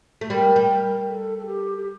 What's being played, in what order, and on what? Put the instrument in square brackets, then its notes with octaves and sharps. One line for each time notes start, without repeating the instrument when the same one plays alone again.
[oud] A3
[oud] G3 [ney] A#4
[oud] G3
[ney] A#4
A4
A4
G4
G4